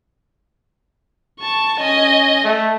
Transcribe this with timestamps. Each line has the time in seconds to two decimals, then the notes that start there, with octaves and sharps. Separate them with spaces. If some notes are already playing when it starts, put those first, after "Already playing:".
1.40 A5 C#6
1.79 C#4 D#5 G#5
2.44 A3